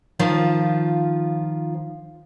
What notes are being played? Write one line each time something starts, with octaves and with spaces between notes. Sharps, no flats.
D#3 F3 F4